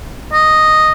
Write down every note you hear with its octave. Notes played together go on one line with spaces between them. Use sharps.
D#5